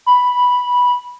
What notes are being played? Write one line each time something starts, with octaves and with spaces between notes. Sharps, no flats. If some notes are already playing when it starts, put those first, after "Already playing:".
B5